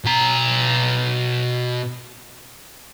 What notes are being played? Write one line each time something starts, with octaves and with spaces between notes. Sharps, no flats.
B2 A#5